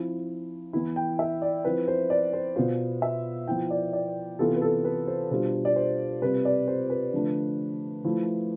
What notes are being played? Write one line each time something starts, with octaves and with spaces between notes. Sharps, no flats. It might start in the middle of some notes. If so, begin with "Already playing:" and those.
Already playing: F3 C4 E4
E3 B3 E4
G5
E5
D5
F3 C4 E4 B4
C5
D5
C5
B2 B3 F4 C5
E5
F3 B3 E4 G5
D5
D5
C3 E3 B3 F4 A4
B4
A4
B4
C5
B2 G3 D4 F4 C5
D5
C5
C3 G3 C4 F4 B4
D5
C5
B4
D3 F3 A3 D4
F3 A3 E4